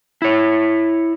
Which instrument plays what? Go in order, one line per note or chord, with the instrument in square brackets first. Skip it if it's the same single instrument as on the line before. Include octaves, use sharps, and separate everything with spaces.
[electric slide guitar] E4 C#5